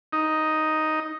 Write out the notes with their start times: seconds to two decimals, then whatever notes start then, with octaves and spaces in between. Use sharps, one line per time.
0.13 D#4